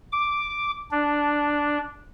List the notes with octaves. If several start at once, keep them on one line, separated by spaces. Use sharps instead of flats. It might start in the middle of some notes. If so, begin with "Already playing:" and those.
D6
D4